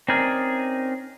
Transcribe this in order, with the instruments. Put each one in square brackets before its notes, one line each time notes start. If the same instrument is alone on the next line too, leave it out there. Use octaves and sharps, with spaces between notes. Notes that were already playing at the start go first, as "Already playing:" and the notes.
[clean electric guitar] C4 C#4 D#4 G#4 A#4 D5